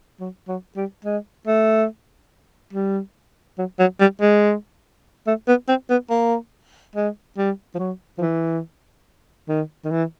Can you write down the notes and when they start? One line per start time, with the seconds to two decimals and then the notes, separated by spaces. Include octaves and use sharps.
0.20 F#3
0.48 F#3
0.76 G3
1.05 G#3
1.47 A3
2.73 G3
3.58 F#3
3.79 F#3
4.00 G3
4.21 G#3
5.27 A3
5.48 B3
5.68 C4
5.90 B3
6.10 A#3
6.96 G#3
7.38 G3
7.75 F3
7.79 F#3
8.18 F3
8.21 E3
9.49 D#3
9.85 D#3
9.91 E3